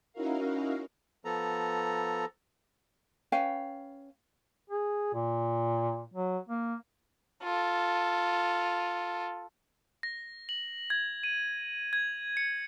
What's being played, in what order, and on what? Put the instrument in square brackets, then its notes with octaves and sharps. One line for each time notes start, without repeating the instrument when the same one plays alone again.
[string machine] C#4 D#4 E4 F#4 A#4 F5
[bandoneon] F3 B3 A4 A#5
[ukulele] C#4 B4 F5 G5
[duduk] G#4
A#2
F#3
A#3
[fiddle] F4 A4
[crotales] A#6
F#7
G#6
D#7
G#6
C#7